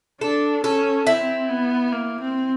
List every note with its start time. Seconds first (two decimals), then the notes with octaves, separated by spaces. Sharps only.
0.21 D4 A4
0.64 C#4 A4
1.06 C4 E4
1.49 B3
1.92 A#3
2.21 C4